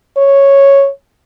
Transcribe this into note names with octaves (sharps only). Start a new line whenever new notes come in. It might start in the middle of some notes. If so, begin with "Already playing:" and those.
C#5